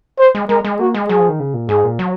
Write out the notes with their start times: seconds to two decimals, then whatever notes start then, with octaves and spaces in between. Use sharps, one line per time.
0.19 C5
0.35 G#3
0.49 G#3 A#4
0.65 G#3
0.79 A#3 F#4
0.94 G#3
1.09 F#3 G#4
1.19 F3
1.29 D#3
1.40 C#3
1.54 A#2
1.69 G#2 G#4
1.84 A#2
1.99 F#3